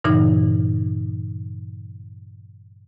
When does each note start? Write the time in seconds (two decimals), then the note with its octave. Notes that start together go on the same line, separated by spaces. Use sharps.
0.04 G2 A#2 C#3 E3 D#4